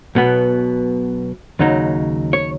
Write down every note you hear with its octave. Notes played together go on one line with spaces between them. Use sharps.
B1 B2 B3
D#2 C#3 F#3 D#4
C#5